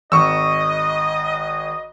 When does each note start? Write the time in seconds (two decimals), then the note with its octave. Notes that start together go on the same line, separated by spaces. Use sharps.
0.12 G#1 D#5 C#6 E6